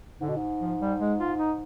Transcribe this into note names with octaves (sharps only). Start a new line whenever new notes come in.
G#2 D3
B2
G#2
F3
G3
G#3
F4
D#4